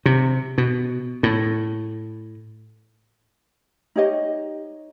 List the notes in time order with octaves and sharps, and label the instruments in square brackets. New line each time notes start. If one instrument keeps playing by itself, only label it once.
[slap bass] C3
B2
A2
[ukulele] D#4 G4 C#5 D#5